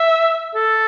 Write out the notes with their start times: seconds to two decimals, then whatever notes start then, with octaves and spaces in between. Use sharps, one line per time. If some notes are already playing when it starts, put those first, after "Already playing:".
Already playing: E5
0.56 A4